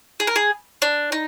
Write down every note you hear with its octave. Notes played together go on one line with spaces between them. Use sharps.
G#4
A#4
G#4
D4
D#4